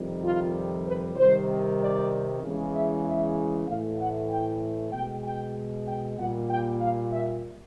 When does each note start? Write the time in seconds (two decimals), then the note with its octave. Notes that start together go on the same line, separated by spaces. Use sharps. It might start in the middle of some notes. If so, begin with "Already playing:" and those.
Already playing: F2 C3 D#3 G3
0.21 F4
0.85 B4
1.15 C3 D#3 G3 C5
1.79 D5
2.41 E2 C#3 E3 G#3
2.73 E5
3.04 E5
3.66 A2 E3 A3 F5
3.98 F#5
4.29 G5
4.92 B2 G#3 G5
5.23 G5
5.87 G5
6.18 A#2 G3 A#3 F#5
6.49 G5
6.81 F5
7.12 E5